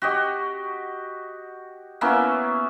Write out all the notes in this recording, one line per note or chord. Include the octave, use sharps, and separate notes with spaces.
F#4 G4 D#5
A#3 B3 C#4 E4